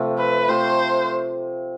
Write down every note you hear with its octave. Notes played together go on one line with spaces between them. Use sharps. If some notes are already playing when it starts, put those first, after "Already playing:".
Already playing: C3 F3 A3
B4
C3 F3 A3 C5